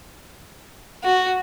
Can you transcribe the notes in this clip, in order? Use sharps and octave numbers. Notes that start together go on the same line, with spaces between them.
F#4